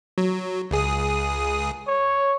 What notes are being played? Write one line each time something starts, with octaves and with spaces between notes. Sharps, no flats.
F#3
C#2 G#4 D#6
C#5